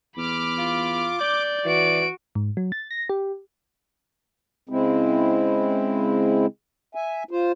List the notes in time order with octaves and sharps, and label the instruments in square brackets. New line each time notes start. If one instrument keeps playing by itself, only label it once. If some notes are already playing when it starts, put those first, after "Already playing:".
[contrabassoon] E2 [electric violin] B5 F6 [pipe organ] D6
[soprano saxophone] F4
[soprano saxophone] D5 [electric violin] G6
[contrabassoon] E3 [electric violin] F#4 D7
[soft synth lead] G#2
F#3
A6
A#6
G4
[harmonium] C#3 G#3 C4 E4
E5 G#5
F4 C5